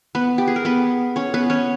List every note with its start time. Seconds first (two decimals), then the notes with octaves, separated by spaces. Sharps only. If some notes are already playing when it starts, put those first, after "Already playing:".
0.15 B3 B4
0.38 G4
0.48 G#4
0.56 A#4
0.65 B3 B4
1.16 C#4 C#5
1.34 B3 B4
1.50 C#4 C#5